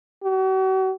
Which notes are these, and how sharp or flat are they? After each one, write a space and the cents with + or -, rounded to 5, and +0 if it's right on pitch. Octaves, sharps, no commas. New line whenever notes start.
F#4 +40